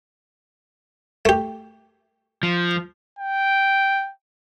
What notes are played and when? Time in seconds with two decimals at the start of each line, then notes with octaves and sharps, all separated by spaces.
1.25 A3 G4
2.43 F3
3.19 G5